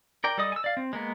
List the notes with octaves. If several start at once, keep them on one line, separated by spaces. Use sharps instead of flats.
A#4 D5 G5
G3 A4 D5 D#5 D#6
G#5 E6
D5 F5
C4
G#3 A#3 B3